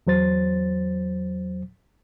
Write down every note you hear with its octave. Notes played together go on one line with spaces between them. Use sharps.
E2 F#3 C5 A6